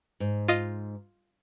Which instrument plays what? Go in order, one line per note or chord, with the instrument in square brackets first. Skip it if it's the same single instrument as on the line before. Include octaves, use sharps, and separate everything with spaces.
[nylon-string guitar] G#2
[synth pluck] F4 D#5